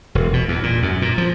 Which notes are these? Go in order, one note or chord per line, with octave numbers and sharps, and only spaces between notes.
E1
B2
E2
A#2
F#2
A#2
F3